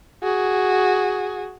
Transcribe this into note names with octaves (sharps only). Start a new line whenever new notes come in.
F#4 G#4